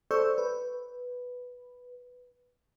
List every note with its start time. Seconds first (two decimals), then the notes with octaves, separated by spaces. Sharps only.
0.11 A4 C5 D5 C#6 E6 G6
0.38 B4